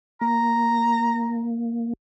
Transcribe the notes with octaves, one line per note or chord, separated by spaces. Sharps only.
A#3 A#5